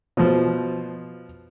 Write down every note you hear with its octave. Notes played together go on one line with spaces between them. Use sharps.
B2 F3